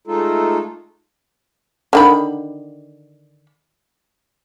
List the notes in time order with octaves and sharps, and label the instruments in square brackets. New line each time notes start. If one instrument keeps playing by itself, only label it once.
[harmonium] G#3 A3 D#4 F4 A4
[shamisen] D3 D#3 B5